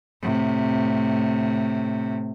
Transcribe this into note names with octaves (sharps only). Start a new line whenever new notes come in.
A2 C3